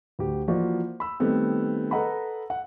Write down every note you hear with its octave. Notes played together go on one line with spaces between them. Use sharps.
D2 G4
E3 F3 A#3 F#4 D5
B5 E6
D#3 G3 A3 B3 C4
A4 B4 D#5 F#5 A#5 B5
F#5